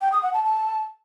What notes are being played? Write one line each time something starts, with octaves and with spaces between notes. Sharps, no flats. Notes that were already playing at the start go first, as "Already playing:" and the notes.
G5
D#6
F#5
A5
A5